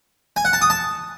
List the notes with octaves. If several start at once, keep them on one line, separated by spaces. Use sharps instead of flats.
G#5
F#5
A5
D#6
A5